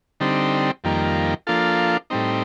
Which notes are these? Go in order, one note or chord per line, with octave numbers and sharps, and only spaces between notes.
D3 G3 C4 D#4
F2 D#3 G3 A#3
F3 A#3 D4 F4 A4
A2 G3 C4 D#4